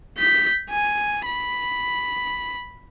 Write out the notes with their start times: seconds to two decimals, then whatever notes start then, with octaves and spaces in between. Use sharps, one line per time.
0.18 G6 B6
0.70 G#5
1.26 B5